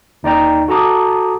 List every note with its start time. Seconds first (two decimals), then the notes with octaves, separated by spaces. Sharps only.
0.23 D#2 D#4 D5 G5 A#5
0.68 F#4 A4 A5 A#5 D6 D#6